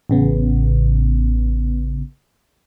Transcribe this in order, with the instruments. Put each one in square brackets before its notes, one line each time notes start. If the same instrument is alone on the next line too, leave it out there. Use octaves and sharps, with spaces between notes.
[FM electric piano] A1 C#3 B3